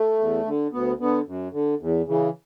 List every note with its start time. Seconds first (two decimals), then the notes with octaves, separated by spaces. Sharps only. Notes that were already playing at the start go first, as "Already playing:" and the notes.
Already playing: A3
0.19 E2
0.46 D3
0.72 D2 B3
1.00 D3 B3
1.27 F#2
1.53 D3
1.80 E2
2.07 C#3 E3